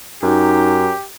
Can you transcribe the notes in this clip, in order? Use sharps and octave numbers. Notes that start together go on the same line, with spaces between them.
F#2 D#4 G4